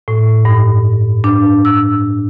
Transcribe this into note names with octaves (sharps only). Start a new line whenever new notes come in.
A2
G2
D4
E6